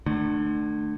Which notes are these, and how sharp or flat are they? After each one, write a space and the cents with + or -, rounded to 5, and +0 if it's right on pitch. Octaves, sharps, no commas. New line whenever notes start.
D3 +30 A3 +0